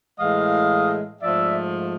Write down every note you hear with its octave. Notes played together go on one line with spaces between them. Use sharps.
A2 E3 G#3 D#5 F5
G#2 F3 A3 D5 E5